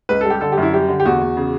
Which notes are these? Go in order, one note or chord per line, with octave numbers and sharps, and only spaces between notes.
C#2 B4
G3 A4
G4
D3 A4
G4
F#2 E4
G3 G4
D3
G4
E2 F#4
E2
C#3